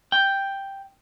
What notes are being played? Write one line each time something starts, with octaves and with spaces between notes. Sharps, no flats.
G5